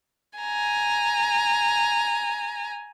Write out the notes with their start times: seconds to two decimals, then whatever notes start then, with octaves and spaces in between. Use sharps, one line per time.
0.39 G#5 A#5